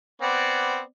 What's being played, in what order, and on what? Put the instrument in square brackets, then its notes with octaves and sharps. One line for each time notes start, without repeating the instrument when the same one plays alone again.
[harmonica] B3 C4 D5